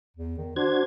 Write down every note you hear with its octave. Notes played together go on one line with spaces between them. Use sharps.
E2
D#3
D4 F#4 C5 G#6